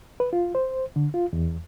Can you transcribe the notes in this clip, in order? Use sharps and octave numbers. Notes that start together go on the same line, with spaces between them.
B4
F4
C5
D3
F4
E2